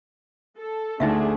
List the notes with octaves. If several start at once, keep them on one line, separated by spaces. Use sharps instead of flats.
A4
D2 A3 D4 D#4 G#4 E5 F5